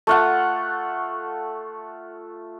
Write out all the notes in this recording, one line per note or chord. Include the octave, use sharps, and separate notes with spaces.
A3 F4 F#5